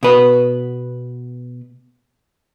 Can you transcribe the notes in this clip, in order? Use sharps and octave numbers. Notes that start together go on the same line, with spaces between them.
B2 B4